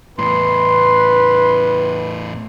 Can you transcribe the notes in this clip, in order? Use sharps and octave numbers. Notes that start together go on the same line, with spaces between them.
E2 A2 B4 C6